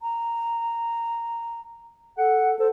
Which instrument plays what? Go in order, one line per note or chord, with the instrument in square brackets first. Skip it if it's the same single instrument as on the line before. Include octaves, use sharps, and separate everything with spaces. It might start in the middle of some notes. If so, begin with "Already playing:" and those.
[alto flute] A#5
[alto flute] A4 [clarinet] F#5
[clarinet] A4 [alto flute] C5